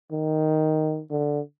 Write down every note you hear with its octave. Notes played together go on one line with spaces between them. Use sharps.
D#3
D3